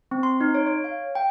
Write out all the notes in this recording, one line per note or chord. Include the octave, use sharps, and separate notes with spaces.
C4
C6
D#4
C#5
C#5
F5
G5